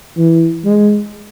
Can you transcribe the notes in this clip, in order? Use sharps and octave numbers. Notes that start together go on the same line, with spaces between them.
E3
G#3